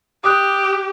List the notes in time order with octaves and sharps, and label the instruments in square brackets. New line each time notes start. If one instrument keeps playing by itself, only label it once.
[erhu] G4 [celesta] D6 D#6 F#6